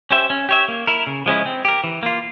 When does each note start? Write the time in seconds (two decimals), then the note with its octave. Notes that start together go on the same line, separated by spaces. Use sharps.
0.11 C#4 G4 C5 E5
0.30 C#4
0.49 G4 C#5 E5
0.68 A#3
0.87 E4 A#4
1.07 C#3
1.26 F3 G#3 C#4 E4
1.46 C4
1.65 G4 A#4
1.84 E3
2.03 A#3 F4